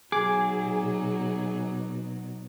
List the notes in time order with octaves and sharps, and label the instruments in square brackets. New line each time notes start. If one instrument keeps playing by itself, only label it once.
[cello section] B2 [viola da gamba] F#3 D#4 [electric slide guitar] G#4 [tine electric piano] D6